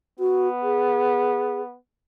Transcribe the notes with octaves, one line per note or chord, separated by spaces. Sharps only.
B3 F#4
G#4